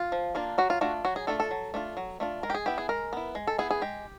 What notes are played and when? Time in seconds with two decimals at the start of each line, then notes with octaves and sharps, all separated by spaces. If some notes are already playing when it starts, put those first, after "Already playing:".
Already playing: F4
0.12 F3
0.35 A#3 D4 F4
0.58 F#3 F#4
0.70 F4
0.81 A3 D4 F4 F#4
1.05 F#3 F#4
1.16 G#4
1.27 A3 D4 F4 A4
1.40 A4
1.51 F#3
1.74 A3 D4 F4
1.97 F#3
2.20 A3 D4 F4
2.43 G#3 A#4
2.50 G4
2.54 G#4
2.66 B3 E4 G4
2.78 G#4
2.89 G#3 A#4
3.13 B3 E4
3.35 G#3
3.47 A4
3.58 B3 E4 G#4
3.71 G#4
3.82 G#3 G4